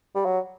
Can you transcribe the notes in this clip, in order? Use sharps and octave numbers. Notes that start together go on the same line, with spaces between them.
G3
F#3